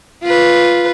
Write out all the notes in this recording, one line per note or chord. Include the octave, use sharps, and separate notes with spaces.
F4 B4